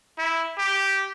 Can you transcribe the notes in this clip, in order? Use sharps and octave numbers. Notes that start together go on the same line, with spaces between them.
E4
G4